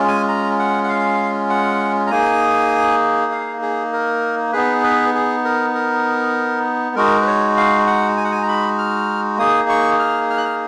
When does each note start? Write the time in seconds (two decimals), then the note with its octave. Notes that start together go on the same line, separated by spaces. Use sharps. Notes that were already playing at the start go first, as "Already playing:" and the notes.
Already playing: G#3 C#4 F4
0.08 G#5
0.28 A#5
0.59 F#5
0.84 F#5
0.89 F5
1.50 F#5
2.07 A#5
2.11 A#3 D#4 G#4 G#5
3.32 F5
3.62 G#4
3.93 A#4
4.53 B3 D#4 G#4 B4
4.84 B4
5.15 G#4
5.45 A#4
5.75 A#4
6.96 G#3 D#4 F#4 A#4
7.22 B4
7.27 C#5
7.57 F5
7.87 F#5
8.17 G#5
8.24 F#5
8.31 G#5
8.43 A#5
8.48 B5
8.78 F6
9.38 A#3 D#4 G#4 D#6
9.69 C#6
9.99 F6
10.30 F6
10.37 F#6
10.45 F6